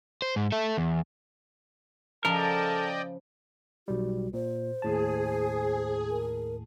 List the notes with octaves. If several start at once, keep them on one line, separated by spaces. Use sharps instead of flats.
C5
G#2
A4 E5
E2
C#3 F3 A4 A#4 D5 D#5 G5 A5
B1 G3 F#4
A#2 C5
D#2 A2 G#4 A5
A#4